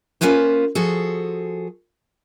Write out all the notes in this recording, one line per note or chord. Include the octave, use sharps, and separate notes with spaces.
A#3 B3 C#4 F4 B4 C5
F3 F#4 G#4 A4